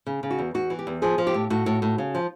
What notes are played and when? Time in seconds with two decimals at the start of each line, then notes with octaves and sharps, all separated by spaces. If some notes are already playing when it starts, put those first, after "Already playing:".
0.07 C#3
0.23 C#3
0.31 F#4
0.39 E2
0.54 E2 F#4
0.70 E3
0.79 G4
0.87 E2
1.02 F3 G#4
1.18 F3
1.27 G4
1.34 A2
1.50 A2 F#4
1.66 A2
1.82 A2
1.98 C#3
2.15 F3